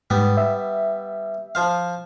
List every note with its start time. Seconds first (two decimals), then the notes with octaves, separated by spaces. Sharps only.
0.10 G#2 G3 B3
0.37 E5
1.55 F3 C5 F5